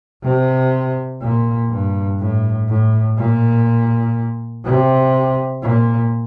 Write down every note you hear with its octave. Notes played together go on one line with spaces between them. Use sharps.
C3
A#2
G2
A2
A2
A#2
C3
A#2